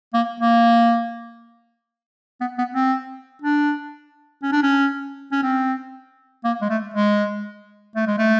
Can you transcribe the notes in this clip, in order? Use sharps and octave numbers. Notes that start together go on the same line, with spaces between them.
A#3
A#3
B3
B3
C4
D4
C#4
D4
C#4
C#4
C4
A#3
G#3
A3
G#3
A3
G#3
A3